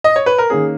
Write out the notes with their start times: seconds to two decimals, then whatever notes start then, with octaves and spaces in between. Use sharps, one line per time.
0.04 D#5
0.16 C#5
0.26 B4
0.38 A#4
0.50 D#3 A#3 C#4 G#4